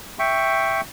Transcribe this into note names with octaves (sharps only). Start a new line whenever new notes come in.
E5 G5 C#6